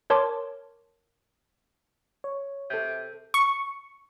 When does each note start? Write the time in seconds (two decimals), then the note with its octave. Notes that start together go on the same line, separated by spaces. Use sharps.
0.10 A#4 C#5 A5 C6 D6
2.24 C#5
2.70 C3 A4 G6
3.34 C#6